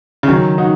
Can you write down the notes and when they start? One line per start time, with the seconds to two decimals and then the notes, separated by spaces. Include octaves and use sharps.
0.23 C#3
0.28 D#3 F#3
0.58 D#4 F#4